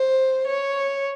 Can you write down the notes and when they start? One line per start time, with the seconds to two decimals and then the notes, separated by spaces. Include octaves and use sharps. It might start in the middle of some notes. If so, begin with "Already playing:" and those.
Already playing: C5
0.47 C#5